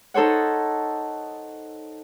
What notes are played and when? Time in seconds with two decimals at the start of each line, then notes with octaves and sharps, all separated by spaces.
0.14 D#4 A4 C5 C#5 F#5